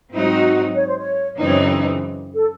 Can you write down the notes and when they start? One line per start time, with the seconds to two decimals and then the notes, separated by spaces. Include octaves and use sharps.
0.12 G#2 F#3 C4 D#4 E4
0.22 E4
0.27 F#4
0.75 C#5
0.87 C5
0.98 C#5
1.38 F#2 C#3 E3 C4 D#4 C#5
2.34 A4